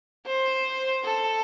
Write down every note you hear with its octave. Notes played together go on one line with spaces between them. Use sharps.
C5
A4